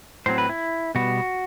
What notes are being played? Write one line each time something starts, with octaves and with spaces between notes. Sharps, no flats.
A2 F#3 C4 C5
B4
E4
B2 G3 B3 F#4